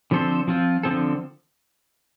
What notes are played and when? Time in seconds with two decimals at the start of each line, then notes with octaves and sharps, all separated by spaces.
0.11 D3 F3 C4 A4 C5
0.48 F3 C4 F4
0.83 D3 F3 C4 A4